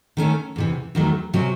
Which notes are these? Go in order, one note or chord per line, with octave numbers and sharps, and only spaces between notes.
D#3 A3 C#4
E2 C3 E3
E2 D#3 F#3 A3
C3 F#3 C#4